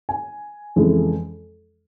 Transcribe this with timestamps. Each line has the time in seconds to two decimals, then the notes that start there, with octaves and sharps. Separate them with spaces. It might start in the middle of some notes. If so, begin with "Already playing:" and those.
0.09 G#5
0.76 F2 C#3 E3 G#3